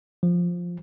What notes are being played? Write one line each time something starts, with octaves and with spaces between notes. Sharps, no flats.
F3